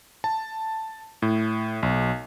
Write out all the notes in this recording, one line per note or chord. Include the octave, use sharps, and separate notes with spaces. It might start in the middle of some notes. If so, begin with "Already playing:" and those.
A5
A2
B1